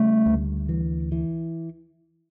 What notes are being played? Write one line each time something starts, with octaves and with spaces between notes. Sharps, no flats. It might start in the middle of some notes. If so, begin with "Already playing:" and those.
Already playing: C#3 G3 A3
D2
E3
E3